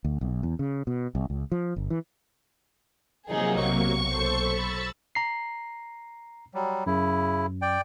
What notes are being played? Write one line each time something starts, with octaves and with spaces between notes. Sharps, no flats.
D2
B1
E2
C#3
B2
C2
C#2
F3
G1
E3
C3 F3 F#3 A#3 D#4 G#4
B1 C#6
A4 C5
B5 E6 A6
A#5 C7
F#3 G3
F#2 C#3 E4
D5 G5